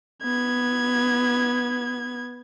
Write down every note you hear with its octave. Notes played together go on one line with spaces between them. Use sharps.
B3 G#6